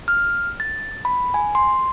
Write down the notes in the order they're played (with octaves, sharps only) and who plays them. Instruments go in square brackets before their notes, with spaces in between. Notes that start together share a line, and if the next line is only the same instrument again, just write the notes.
[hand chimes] F6
A6
B5
G#5
C6